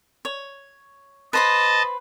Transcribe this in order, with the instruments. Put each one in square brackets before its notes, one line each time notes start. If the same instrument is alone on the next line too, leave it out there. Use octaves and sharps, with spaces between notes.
[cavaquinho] C#5
[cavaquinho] B4 C5 B5 [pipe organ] D#5 A5